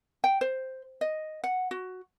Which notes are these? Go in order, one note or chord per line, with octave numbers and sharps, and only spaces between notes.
G5
C5
D#5
F#5
F#4